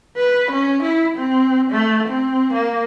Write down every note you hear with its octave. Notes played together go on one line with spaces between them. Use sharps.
B4
C#4
E4
C4
A3
C4
A#3